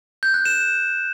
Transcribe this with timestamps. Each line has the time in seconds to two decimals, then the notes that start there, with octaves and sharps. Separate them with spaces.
0.23 G6
0.34 F#6
0.45 E7